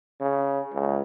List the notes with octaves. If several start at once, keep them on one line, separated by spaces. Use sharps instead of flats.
C#3
C#2